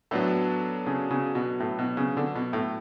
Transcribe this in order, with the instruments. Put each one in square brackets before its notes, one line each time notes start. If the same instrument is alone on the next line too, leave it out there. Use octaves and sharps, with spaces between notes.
[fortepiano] A2 [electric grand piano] F#3 B3 D4 A4
[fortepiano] C#3
C#3
B2
A2
B2
C#3
D3
B2
A2